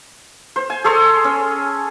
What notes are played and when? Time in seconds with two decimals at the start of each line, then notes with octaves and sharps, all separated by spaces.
0.56 C5
0.70 G#5
0.84 G#4 A4 C#5 C6
1.24 C#4